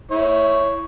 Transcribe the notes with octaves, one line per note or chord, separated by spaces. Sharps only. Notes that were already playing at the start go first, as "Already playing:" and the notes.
E4 C#5